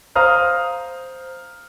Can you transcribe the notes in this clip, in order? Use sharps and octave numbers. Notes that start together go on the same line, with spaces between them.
C5 F5 A#5 D#6 F6